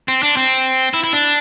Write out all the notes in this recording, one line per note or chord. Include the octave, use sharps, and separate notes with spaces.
C4
D4
C4
E4
E4
D4